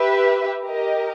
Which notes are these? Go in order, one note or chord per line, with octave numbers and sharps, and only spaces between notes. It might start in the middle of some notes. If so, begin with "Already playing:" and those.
Already playing: G4 B4 E5
G4 A#4 D#5